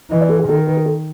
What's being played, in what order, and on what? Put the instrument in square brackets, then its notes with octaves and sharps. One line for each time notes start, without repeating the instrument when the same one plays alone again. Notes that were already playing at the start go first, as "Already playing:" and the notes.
[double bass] E3 [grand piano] D#5
[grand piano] D5
A4
G#4
[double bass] D#3 [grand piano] A4
[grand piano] A#4
B4
A#4
A4